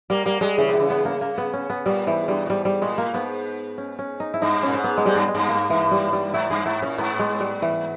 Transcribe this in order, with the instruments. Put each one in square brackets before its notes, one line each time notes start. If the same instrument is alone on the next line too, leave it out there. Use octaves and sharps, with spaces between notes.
[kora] G3 [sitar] A#3
[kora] G3 [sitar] A#3
[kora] G3 [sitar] G#3
[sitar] C#3 [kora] E3
[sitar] B2 [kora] E3
[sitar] C#3
[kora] B3
A#3
A#3
B3
C#4
B3
[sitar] A#2 [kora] G3
[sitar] G#2 [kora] E3
[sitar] G2 [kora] G3
[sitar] A#2
[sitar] G#2 [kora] G3
[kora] G3
[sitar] A#2 [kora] G#3
[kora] A#3
[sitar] G#2 [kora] B3
[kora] C#4
C#4
D#4
E4
[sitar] G2 [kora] D#4
[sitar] A#2 [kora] C#4
[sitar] G#2
[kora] B3
G#3
[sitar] G#2 [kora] G3
[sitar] G2
[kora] G#3
[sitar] G2
[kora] A#3
E3
G3
G3
[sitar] G#2 [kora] E4
[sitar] G2 [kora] G#4
[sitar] G#2 [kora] E4
[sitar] A#2 [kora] C#4
[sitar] G#2 [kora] B3
[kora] G#3
G3
E3